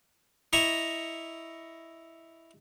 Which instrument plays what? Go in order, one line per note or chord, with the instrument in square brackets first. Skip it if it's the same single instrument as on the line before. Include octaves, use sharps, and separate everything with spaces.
[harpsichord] E4 D#5 E5 A#5 C#6